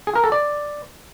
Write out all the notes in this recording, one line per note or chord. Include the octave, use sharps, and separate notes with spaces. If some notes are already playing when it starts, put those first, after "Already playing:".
G#4
A#4
A4
D5